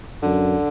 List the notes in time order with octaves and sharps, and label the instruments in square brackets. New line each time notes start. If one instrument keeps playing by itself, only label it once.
[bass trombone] F#2 [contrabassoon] D3